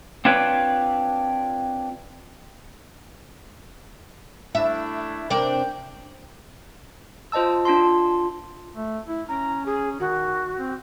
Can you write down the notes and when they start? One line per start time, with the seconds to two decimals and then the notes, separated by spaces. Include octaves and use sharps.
0.25 C4 D4 F4 B4 C#5 D5
4.55 A3 D4 E4 E5
5.30 C3 D4 A#4 G5
7.32 F4 C5 D#5 A5 E6
7.65 D4 F4 A5 C6
8.75 A3
9.08 E4
9.29 C#4 A#5
9.66 G#4
10.00 D#3 F#4
10.58 C4